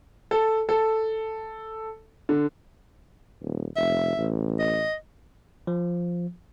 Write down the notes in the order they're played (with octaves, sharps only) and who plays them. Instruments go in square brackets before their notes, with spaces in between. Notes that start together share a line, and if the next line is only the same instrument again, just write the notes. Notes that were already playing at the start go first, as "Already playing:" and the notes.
[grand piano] A4
A4
D3
[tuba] D#1
[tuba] F1 [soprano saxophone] E5
[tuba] A1
[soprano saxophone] D#5
[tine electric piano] F3